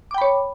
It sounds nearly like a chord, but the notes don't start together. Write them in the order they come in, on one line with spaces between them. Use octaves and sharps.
D6 G5 B5 C#5